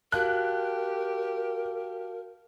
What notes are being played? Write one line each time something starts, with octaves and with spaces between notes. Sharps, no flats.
F#4 G4 A#4 F5 A5 F#6